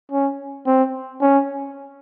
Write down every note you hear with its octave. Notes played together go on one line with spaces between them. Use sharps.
C#4
C4
C#4